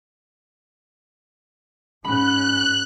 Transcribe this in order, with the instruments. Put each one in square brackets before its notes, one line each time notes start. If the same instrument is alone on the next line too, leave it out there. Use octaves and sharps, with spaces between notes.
[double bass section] G#2 C#4 [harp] B5 [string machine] F#6